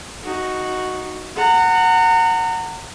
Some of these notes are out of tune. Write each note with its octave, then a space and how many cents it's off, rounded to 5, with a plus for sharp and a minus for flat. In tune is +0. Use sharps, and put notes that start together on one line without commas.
D#4 +0 F#4 +0
F#5 +0 A#5 -35